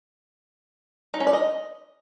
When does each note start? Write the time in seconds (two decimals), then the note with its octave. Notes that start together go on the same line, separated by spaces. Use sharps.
1.14 D#4
1.20 C#4
1.27 D5
1.33 D#5